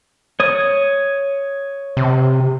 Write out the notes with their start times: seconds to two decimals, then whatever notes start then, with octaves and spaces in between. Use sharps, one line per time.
0.40 C#5 D#6
1.97 C3